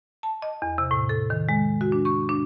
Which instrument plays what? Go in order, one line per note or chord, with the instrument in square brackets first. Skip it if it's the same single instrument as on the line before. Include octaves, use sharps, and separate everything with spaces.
[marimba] A5
D#5
E2
C3
A2
A4
D#3
G#3
F#4
D4
C#6
D4